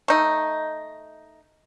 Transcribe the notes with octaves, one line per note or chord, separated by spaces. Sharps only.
A3 D#4